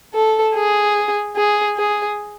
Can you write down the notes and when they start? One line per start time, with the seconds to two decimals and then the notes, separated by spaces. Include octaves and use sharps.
0.14 A4
0.55 G#4
1.36 G#4
1.77 G#4